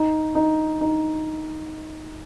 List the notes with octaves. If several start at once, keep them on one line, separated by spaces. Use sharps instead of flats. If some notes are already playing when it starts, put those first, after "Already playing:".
Already playing: D#4
D#4
D#4